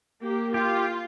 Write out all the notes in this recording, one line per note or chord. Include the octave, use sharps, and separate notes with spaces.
A#3 G4
F4 G4